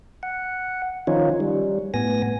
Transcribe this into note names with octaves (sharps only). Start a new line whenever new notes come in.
F#5
D#3 F3 C#4 D#4 F4 C#5
G3
A2 B3 G#5 A#6